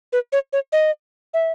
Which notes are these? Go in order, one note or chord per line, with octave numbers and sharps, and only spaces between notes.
B4
C#5
C#5
D#5
E5